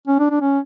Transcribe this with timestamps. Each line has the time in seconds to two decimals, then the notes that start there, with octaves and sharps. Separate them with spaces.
0.08 C#4
0.19 D4
0.30 D4
0.41 C#4